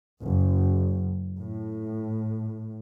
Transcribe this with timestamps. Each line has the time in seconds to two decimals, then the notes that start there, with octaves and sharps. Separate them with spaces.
0.23 F#1
1.38 A2